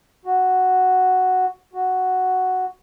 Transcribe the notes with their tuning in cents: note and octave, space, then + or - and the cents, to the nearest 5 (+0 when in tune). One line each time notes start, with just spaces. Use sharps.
F#4 +0
F#4 +0